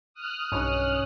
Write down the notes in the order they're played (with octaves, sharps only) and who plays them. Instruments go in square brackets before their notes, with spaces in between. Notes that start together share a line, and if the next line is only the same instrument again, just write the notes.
[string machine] D#6 F6 F#6
[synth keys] B1 G2 [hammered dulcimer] C#4 D#4 C#5